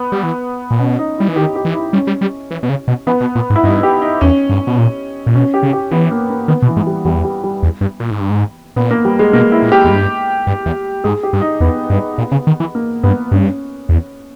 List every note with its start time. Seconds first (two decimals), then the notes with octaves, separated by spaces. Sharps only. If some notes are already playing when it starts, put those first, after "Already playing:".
Already playing: B3
0.12 G3
0.23 E3
0.71 A#2
0.79 B2 C#4
0.99 D#4
1.18 G3 E4
1.28 E3
1.36 D#3 G4
1.55 G4
1.65 E3
1.75 E4
1.93 G3 C#4
2.07 G3
2.21 G3
2.51 E3
2.63 B2
2.69 C#3
2.88 B2
3.07 E3 B3
3.21 B2
3.35 A#2
3.50 G#2
3.56 E4
3.64 G2 D#4
3.83 G4
4.02 D#4
4.21 E2 C#4
4.50 G2
4.67 B2
4.78 A#2
5.26 A#2
5.35 B2 C#4
5.54 G4
5.63 C#3
5.73 G4
5.91 E3 B3
6.11 A#3
6.30 A#3
6.48 D#3 B3
6.62 B2
6.68 E3
6.77 G#2
6.87 G3
7.05 E2 G3
7.24 G3
7.44 G3
7.63 E2
7.81 G2
8.00 A#2
8.11 G#2
8.20 G2
8.30 G#2
8.76 A#2 B3
8.91 A#3
9.05 G3
9.19 G#3
9.33 B2 A#3
9.52 E4
9.62 A#2
9.72 G4
9.84 E2
9.90 G2
10.47 G2
10.66 E2
11.04 G#2 G#4
11.23 G4
11.33 G2
11.42 D#4
11.60 E2 B3
11.90 G2
12.18 A#2
12.32 C#3
12.47 D#3
12.60 E3
12.75 A#3
13.03 G2 B3
13.31 G2 C#4
13.89 E2